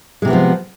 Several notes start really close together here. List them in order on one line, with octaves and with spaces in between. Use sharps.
G#3 C3 E3 B3 F3